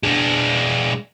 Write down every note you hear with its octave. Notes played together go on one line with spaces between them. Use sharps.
G#3 D4